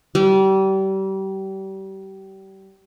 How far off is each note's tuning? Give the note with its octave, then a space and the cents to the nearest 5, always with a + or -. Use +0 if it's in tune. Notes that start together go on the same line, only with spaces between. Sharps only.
G3 -30